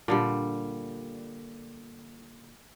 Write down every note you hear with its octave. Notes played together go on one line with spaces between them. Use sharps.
A#2 D3 G3